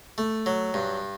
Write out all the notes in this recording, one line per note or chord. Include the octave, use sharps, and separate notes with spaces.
A3
F#3
G2